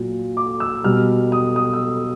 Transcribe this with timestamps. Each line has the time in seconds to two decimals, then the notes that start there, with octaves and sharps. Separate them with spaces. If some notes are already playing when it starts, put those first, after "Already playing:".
Already playing: A#2 F#3
0.37 D6
0.60 E6
0.84 B2 G3 F6
1.32 D#6
1.56 D#6
1.73 E6